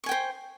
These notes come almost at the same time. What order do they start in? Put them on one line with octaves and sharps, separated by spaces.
C#6 G#5 G5 C5